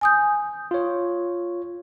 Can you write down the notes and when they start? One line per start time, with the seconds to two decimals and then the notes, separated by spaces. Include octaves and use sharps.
0.01 G#5 D#6 G6
0.71 F4 C#5